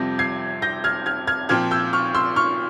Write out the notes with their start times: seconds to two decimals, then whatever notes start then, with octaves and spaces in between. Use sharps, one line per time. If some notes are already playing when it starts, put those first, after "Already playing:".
Already playing: F2 C3 G3 C4 G6 A#6
0.19 G#6 C7
0.62 G6 A#6
0.84 F6 G#6
1.06 F6 G#6
1.27 F6 G#6
1.49 A#2 F3 C4 F6 G#6
1.71 E6 G6
1.93 C#6 F6
2.15 C6 E6
2.36 C#6 F6